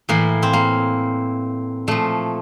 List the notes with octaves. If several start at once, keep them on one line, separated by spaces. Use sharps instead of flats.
A2 E3 A#3
C4
A#3
A#2 F3 A3